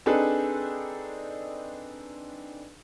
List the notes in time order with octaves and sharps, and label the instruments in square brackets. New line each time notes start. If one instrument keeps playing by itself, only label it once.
[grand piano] C4 D4 D#4 G#4 A4 B4